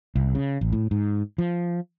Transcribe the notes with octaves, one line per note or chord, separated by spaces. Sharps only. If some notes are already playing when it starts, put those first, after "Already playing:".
C2
C#3
A1
A2
G#2
F3